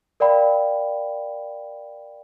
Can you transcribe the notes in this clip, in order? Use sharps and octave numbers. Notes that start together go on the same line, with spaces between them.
A#4 D5 F5 G5 B5